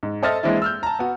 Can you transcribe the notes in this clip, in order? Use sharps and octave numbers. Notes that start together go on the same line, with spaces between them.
G#2
A4 C5 D#5 E5 F6 A6
E3 G#3 A#3 C4 D4 E4
E6 F6 G6
A5 A#5
B3 F#4